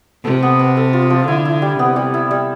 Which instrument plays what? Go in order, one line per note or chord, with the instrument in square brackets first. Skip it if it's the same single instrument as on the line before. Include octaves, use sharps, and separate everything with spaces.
[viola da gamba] C3 [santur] A4
[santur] B3
B3
A4
F4
F3
[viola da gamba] D3 [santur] E4
[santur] E4
G3
[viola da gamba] C3 [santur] B3
[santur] G3
E4
G3